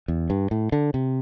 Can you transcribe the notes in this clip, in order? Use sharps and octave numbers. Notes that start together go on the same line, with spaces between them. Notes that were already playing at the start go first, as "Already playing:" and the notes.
E2
G2
A2
D3
C3